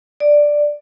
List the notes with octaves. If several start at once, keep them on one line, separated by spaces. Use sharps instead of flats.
D5